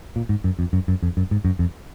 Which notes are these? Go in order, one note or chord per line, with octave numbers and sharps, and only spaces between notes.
A#2
G#2
F#2
F2
F#2
F#2
F2
F#2
G#2
F#2
F2